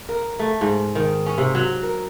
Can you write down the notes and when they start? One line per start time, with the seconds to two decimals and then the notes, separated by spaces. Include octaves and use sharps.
0.09 A#4
0.39 A3
0.61 G#2
0.95 D#3
1.26 C#4
1.38 C3
1.55 F#3
1.83 A#4